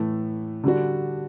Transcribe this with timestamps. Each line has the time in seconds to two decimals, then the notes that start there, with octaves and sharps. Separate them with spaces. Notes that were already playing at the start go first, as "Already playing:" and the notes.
Already playing: A2 E3 A3
0.64 D3 G3 D4 F#4